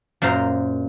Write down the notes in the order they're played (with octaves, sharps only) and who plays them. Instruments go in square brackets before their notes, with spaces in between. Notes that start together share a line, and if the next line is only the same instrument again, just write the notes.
[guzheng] F#2 A#2 C5 F5 A#5 C6